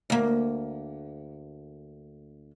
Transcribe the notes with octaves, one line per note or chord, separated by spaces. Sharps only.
D2 A#3